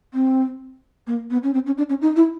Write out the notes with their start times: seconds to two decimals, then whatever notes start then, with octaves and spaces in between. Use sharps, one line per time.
0.14 C4
1.07 A#3
1.31 B3
1.43 C#4
1.54 C4
1.66 C#4
1.78 D4
1.89 C#4
2.01 D#4
2.16 E4